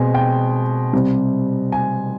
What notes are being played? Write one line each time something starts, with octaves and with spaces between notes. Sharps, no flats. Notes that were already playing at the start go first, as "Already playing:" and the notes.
Already playing: B2 G#3 C4 G#5
G5
C3 G3 C4
G#5